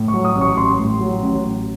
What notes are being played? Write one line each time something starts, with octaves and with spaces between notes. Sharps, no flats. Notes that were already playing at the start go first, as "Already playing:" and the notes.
Already playing: A2
C#6
F#3
D#6
A1
C#6
A1 C6
A2
F#3
A1
A1